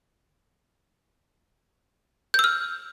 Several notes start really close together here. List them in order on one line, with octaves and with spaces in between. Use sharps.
G6 E6 F6